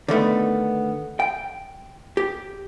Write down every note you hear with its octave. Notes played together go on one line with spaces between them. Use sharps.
D3 D#3 A3 B3
G5
G4